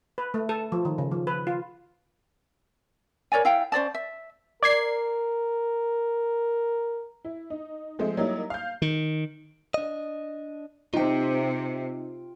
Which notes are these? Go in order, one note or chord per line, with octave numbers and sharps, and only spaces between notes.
B4
A3
A4
F3
D#3
C#3
F3
B4
F4
A#4 C#5 D5 G#5
E4 F5 G5
C#4 C5 D5 A5
E5
A#4 D5 G#6 C7
E4
D#4
F3 G#3 A3 C4 C5
F#3 G3 A#3 D#4 E4
F5 G6
D#3
D4 D#5
C3 D#4 F4 G5